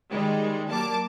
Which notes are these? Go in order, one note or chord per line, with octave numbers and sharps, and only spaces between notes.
D#3 G3 G#3
F#3 A#3 A5 D6